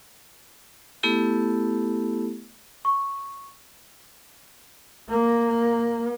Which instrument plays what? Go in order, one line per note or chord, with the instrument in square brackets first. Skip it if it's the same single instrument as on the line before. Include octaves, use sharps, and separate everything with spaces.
[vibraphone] A3 B3 E4 G4 A4
[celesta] C#6
[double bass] A#3